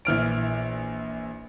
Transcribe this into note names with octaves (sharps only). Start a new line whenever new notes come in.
A#1 E3 F6 D7